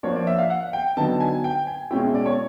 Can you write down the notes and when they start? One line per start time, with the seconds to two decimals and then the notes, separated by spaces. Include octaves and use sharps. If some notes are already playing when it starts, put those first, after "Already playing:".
0.03 F3 A#3 D4 C#5
0.15 D5
0.27 E5
0.38 F5
0.50 F#5
0.73 G5
0.97 D3 F#3 B3 D#4 A5
1.20 G#5
1.44 G5
1.67 G#5
1.91 B2 G#3 C#4 E4 G5
2.14 D5
2.26 C#5